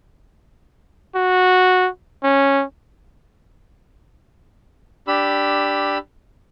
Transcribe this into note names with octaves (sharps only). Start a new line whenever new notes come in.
F#4
C#4
D4 G4 B5 E6